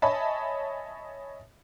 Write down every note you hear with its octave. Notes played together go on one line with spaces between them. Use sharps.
C#5 D#5 E5 G#5 A5 B5